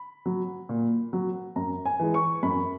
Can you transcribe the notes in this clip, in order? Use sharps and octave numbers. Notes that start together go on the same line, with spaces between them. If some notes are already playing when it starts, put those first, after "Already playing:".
Already playing: B5
F#3
A#2
F#3
F#2 A#5
G#5
E3 G#3
C#6
F#2 B5